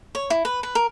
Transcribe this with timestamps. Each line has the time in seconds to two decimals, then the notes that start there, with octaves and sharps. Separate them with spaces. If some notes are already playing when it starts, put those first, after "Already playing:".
0.15 C#5
0.30 E4
0.45 B4
0.63 B4
0.75 A#4